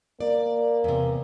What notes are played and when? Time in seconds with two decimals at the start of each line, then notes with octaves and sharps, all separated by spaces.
0.20 A#3 D5
0.84 E2 C3